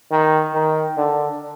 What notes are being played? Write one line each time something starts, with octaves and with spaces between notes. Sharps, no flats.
D#3
D#3
D3